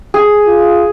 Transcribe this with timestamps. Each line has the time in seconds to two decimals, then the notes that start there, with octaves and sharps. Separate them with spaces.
0.14 G#4
0.46 F4